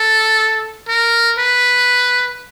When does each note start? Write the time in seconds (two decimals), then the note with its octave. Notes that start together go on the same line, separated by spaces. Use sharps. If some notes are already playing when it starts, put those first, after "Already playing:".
Already playing: A4
0.88 A#4
1.39 B4